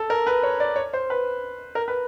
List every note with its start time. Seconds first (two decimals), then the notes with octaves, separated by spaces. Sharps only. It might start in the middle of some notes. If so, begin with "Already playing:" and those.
Already playing: A4
0.10 A#4
0.27 B4
0.43 C#5
0.60 D5
0.76 C#5
0.94 C5
1.10 B4
1.75 A#4
1.88 B4